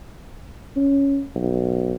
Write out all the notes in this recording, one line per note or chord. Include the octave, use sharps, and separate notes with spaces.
C#4
B1